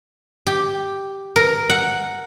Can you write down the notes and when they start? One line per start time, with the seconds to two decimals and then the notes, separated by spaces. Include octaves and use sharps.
0.47 G4
1.36 A#4
1.69 F#5